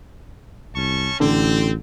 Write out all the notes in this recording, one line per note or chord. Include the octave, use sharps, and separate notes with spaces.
C2 C#4 A5 C#6
A1 D3 C4